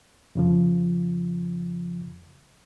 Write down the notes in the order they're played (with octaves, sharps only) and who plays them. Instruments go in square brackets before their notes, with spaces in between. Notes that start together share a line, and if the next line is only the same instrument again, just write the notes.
[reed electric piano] F2 C#3 F3